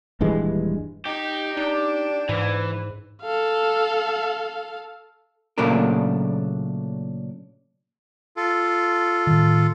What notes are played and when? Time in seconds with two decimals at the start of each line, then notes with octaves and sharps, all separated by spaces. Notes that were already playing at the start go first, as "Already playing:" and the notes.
0.21 D#1 G2 E3 G#3
1.06 D#4 G4
1.57 D4 D#4
2.29 G#2 E3
3.22 A4 F5
5.58 A#2 C#3 F#3 A3 D4 A#4
8.37 F4 A4
9.27 A2 D#3